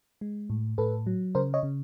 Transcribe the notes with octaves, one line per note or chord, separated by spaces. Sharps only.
G#3
A2
A2 A4 B4
F#3
C#3 A#4 C5
C#5 D#5
C#3